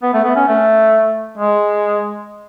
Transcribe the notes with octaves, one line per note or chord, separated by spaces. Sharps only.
B3
A3
B3
C#4
A3
G#3